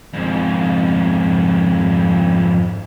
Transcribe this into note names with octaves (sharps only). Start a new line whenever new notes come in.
F2 G#2